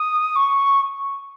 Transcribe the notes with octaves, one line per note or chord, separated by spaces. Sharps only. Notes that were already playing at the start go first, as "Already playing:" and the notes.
Already playing: D#6
C#6